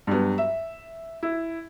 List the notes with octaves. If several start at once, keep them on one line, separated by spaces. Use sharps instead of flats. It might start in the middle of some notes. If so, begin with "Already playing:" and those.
G2 F#3 B3
E5
E4